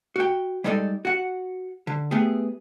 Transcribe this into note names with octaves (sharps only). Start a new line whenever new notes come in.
F#4 G5
G3 G#3 D#4 A4 D5
F#4 F#5
D3
A3 B3 G4 G#4